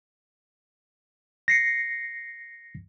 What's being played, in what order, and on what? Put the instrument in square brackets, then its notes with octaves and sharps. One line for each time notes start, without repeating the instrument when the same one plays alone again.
[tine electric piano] A#6 C7 C#7